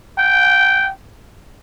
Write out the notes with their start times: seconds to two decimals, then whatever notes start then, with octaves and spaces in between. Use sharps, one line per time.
0.18 G5